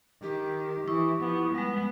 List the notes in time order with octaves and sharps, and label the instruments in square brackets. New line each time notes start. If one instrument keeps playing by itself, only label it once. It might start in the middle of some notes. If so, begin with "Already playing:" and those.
[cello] D#3 [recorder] G4
[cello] E3 [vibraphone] E4 C#6 D#6
[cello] F3 B3
[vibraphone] G3 G#3 [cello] B3